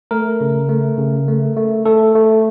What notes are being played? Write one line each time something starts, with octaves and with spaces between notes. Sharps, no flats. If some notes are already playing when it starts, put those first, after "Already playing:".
A3 A#4
C#3
A3
C#3
A3
A3
A3 A4
A3